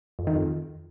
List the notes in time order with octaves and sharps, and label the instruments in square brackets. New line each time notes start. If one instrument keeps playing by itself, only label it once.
[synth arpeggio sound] F2
D#3
F2